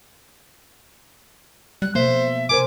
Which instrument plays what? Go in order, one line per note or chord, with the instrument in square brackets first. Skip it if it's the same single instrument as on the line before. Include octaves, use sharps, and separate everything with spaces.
[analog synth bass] G3 [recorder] F#6
[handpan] B2 F3 A3 [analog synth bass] A#3 [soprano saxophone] C5 [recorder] E5
[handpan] C3 A#4 C5 [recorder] G#5 [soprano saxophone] D6